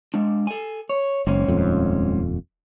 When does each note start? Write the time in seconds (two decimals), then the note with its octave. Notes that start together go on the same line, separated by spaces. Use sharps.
0.14 G#3 D4
0.47 A4 G#5
0.89 C#5
1.27 F#1 G#2 C4 C#4
1.48 D#1 F2